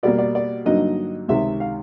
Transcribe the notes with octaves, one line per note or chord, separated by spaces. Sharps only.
B2 G3 A#3 D5
D5
D5
G2 D3 F#3 A#3 D#4 D#5
C#2 C3 D#3 E5
F5